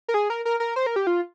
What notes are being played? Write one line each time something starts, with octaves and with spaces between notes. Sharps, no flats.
A#4
G#4
A#4
A#4
A#4
C5
A#4
G4
F4